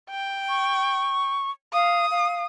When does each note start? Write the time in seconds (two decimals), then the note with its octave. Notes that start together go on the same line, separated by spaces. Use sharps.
0.10 G5
0.49 C#6
1.73 F5 D#6
2.11 F5